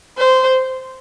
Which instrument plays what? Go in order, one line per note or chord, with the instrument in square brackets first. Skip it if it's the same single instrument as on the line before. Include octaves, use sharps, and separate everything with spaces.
[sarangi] C5